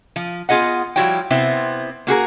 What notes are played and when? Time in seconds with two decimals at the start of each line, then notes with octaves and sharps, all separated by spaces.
0.16 F3
0.49 B3 F4 G#4 D#5 F#5
0.96 F3 G3 E4 F#4 C#5 G5
1.30 C3 B3 C4 E4
2.07 A#3 F#4 G#4 A#4